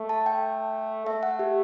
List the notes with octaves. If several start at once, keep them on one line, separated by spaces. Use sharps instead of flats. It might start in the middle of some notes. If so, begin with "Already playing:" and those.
Already playing: A3
A5
G5
A3 E5
F#5
G4